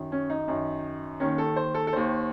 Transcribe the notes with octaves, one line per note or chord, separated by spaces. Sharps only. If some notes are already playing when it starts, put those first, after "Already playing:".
Already playing: F#2 D#3
C#4
D#4
F#2 D#3
D#2 D#3 C#4
A4
C5
A4
A4
D#2 D#3 C5